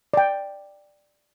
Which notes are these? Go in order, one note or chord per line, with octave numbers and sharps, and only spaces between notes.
D5 G5